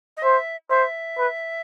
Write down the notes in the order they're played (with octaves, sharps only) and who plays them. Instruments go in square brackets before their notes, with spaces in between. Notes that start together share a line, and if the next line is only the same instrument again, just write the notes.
[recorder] D#5
[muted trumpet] C5 [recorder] E5
[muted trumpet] C5 [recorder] E5
[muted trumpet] B4